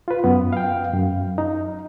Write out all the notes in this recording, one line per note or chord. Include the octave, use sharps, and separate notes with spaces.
F4 B4
F#2 B3
F5 G5
F#2
D#4